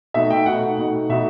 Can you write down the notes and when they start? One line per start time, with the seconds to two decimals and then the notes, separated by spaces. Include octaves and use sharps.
0.14 B2 A3 D#4 E5
0.30 G5
0.46 B2 A3 D#4 F#5
0.78 B2 A3 D#4
1.09 B2 A3 D#4 E5